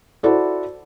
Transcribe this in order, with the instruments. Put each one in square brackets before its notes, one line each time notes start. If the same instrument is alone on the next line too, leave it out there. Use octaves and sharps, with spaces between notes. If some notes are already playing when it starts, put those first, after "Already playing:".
[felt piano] E4 F#4 A4 C5 D5